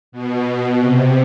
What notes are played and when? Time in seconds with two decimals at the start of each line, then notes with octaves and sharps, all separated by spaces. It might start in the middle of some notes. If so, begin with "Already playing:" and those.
0.12 B2
0.81 C3